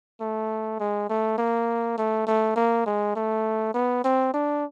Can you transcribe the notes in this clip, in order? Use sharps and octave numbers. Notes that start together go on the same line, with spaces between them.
A3
G#3
A3
A#3
A3
A3
A#3
G#3
A3
B3
C4
D4